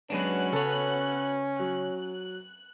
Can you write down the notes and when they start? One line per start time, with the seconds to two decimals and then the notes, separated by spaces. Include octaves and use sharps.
0.10 F#3 G#3 B3 C#4 D4 F#4 F#6
0.53 C#3 A4 C#5
1.60 F#3 F#6